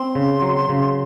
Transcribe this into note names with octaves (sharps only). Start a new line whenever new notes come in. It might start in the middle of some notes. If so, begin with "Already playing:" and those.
Already playing: C4 C6
C#3
F#3
C#3